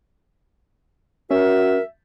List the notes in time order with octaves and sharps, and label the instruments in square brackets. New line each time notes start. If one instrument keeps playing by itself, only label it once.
[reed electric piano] C#4 [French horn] F#4 [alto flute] A#4 [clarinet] E5